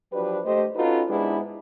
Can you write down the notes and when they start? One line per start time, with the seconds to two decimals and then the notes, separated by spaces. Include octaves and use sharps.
0.13 F3 F#3 D4 G4 B4
0.45 G2 A3 G4 C5 D#5
0.76 C#4 D#4 F4 F#4 A4 B4
1.09 G#2 G#3 B3 D4 E4 G4